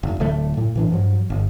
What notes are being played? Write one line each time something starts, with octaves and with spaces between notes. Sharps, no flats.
F1
D1 D3 F#3 A3
A2
A2 E3 D4
G2 F3 F#3
G1